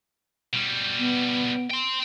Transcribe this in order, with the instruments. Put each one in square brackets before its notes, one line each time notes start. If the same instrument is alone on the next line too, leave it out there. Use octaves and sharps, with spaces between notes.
[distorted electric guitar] B2 G3
[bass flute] B3
[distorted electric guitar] G5 C6